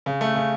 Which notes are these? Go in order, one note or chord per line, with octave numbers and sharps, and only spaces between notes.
C#3
A3
C#3